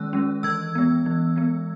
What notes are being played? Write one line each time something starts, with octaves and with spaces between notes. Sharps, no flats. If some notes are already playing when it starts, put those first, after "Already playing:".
Already playing: D#3 G#3 C#4 E6 F#6
G#3 C#4
E3 E6 G#6
G#3 B3
E3
G#3 B3